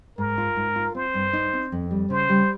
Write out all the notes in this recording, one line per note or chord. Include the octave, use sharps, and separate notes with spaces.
G#2 A#4
F4
G#2
F4
C4 C5
G2
D#4
C4
F2
G3
C#3 C5
G3